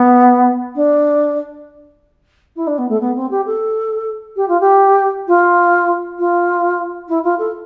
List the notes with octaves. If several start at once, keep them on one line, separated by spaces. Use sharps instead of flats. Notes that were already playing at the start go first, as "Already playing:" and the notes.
Already playing: B3
D4
E4
D4
B3
A3
B3
C4
G4
A4
G4
F4
G4
F4
F4
E4
F4
A4